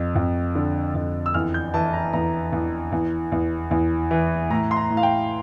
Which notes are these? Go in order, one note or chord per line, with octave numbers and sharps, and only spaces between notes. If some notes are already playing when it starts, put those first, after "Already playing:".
Already playing: F2
F2
D3
F2
E6
E2 F6
G6
E3 A5
A#5
E2 A#5
E2
E2
E2
E2
E3
A2 A#5
C6
A#5
A2
F5
G5